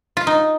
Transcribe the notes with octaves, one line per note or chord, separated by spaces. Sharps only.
F4
D#4